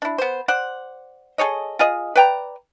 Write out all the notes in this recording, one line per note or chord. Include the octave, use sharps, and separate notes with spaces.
D4 E4
B3 C5
C5 D5 F#5
G#4 A4 C#5 D#5
F4 G#4 D#5
B4 D5 G5 A#5